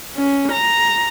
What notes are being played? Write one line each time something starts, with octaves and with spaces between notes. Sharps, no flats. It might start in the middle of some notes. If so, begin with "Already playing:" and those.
C#4
A#5